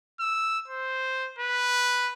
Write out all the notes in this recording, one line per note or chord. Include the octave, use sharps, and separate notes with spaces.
E6
C5
B4